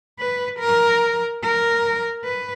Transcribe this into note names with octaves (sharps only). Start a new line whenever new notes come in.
B4
A#4
A#4
B4